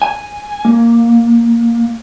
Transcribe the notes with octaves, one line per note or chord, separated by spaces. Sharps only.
G#5
A#3